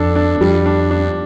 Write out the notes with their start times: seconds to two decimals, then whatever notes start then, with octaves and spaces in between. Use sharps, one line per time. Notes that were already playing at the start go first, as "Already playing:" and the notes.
Already playing: F2 D4 A4
0.16 D4
0.41 F2 G3
0.66 D4
0.91 D4